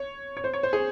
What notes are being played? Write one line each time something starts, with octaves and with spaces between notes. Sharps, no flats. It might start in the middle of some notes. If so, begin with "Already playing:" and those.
Already playing: C#5
C#5
C5
C#5
C5
G#4